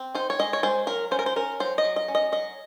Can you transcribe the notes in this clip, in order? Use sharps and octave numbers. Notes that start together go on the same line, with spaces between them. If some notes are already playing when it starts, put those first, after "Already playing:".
Already playing: C4
D#4 C5
C#5
G#3 D#5
C#5
G#3 C5
F#3 A#4
C#4 C5
A#4
C5
C#4 A#4
F#3 C5
D#5
F#3
D#5
C#4
D#5
F#3 D#5